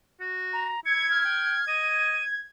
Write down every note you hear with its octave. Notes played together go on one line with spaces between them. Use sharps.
F#4
A#5
E4 G#6 C#7
F6
G5
D#5 D#7